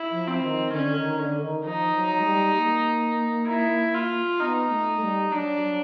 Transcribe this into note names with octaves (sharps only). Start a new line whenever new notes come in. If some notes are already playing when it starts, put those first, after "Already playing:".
Already playing: E4
F3
C4
D#3
D3 C#4
D#3
D3
D#3
F3 D#4
F#3
G#3
G3
A#3
E4
F4
B3 D#4
A3
G3
F#3 D4
F#3